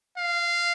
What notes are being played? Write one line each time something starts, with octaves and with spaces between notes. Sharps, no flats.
F5